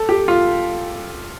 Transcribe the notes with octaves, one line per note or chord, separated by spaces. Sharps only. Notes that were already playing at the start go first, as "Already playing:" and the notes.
Already playing: A4
G4
F4